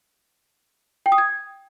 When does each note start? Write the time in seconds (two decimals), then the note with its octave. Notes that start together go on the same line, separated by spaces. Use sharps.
1.06 G5
1.12 D#6
1.18 G#6